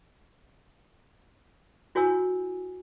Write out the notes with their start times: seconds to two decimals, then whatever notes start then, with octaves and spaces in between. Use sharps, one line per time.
1.95 E4 F#4 C#5 G#5 E6